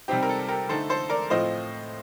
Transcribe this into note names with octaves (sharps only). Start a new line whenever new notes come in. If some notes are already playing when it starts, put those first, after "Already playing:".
C3 G3 C4 D#4 G4
A#4
A4
G4 A#4
D3 A3 D#4 A4 C5
A4 C5
A#4 D5
A2 F3 C4 F4 C5 D#5